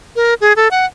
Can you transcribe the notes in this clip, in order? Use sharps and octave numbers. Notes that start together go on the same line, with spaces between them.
A#4
G#4
A4
F#5